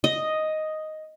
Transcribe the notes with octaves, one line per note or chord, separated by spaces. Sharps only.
D#5